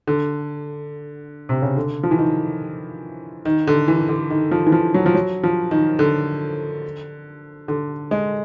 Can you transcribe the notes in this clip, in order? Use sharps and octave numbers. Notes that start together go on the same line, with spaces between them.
D3
C3
C#3
D3
F3
E3
D#3
D#3
D3
E3
D3
D#3
F3
E3
F3
F#3
F3
F#3
F3
D#3
D3
D3
G#3